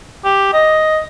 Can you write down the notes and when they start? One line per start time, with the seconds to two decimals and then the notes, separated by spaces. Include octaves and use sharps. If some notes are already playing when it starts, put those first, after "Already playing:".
0.25 G4
0.53 D#5